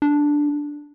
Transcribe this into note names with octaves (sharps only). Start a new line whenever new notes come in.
D4